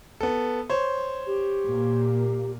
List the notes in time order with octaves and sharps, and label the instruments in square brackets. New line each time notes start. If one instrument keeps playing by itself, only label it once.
[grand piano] B3 A4
C5 C#5
[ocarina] G4
[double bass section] A#2 A#3